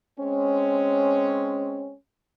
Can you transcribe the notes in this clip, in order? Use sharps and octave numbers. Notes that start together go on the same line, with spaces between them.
G#3 C4 C#4